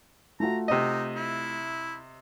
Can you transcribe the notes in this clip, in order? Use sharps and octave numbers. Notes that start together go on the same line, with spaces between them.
A3 F4 F#4 A#5
C3 D#4 D#5
E4